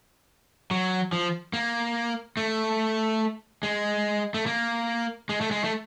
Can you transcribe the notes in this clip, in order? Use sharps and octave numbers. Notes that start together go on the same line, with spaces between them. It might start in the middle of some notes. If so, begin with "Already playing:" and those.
F#3
F3
A#3
A3
G#3
A3
A#3
G#3
A3
G#3
A3